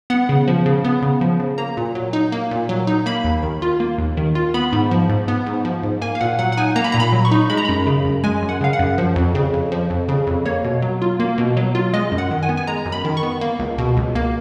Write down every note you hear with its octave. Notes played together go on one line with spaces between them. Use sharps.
B3 F#5
C#3
F3
C#3
B3
C#3
F3
C#3
A#3 A#5
A#2
F#3
D#4
A#3
A#2
F#3
D#4
A#3 B5
D#2
D#3
F4
A#3
D#2
D#3
F4
B3 B5
G#2
F3
G#2
B3
G#2
F3
G#2
A#3 G#5
F5
A#2 F#5
F#3 F#5
F#5
D#4 G#5
A#3 A#5
B5
A#2 A#5
B5
F#3
C#6
D#4
G#3 B5
A#5
F#2 B5
C#3
F#2
G#3 G#5
F#2
F#5
C#3 F5
F#5
F#2
F3
F2
C#3
F2
F3
F2
C#3
F2
A#3 C#5
B2
F#3
F4
A#3
B2
F#3
F4
G#3 D#5
F#2
F#5
D#3
G#5
B3
G#5
G#3 A#5
F#2
B5
D#3
C#6
B3
A#3
C#2
B2
C#2
A#3